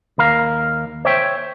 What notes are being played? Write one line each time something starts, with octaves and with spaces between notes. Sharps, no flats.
D#2 A#4 F5
C5 C#5 E5 G5